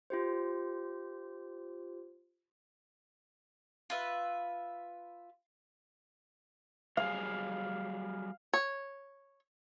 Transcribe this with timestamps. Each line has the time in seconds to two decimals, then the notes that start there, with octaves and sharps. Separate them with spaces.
0.10 F4 G4 C5
3.90 F4 B4 E5
6.97 F#3 G3 G#4 F5
8.53 C#5